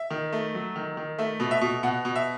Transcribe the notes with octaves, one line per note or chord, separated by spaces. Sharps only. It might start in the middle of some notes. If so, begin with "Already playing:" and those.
Already playing: E5
D#3
A3
F#3
D#3
D#3
A3 E5
B2
E5
B2
B2 F#5
B2
E5